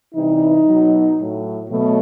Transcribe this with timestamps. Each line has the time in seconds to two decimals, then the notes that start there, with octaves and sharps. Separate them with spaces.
0.15 C3 E3 G3 D#4
0.66 B2 F#3
1.18 A2 F#3
1.70 B2 F#3 A3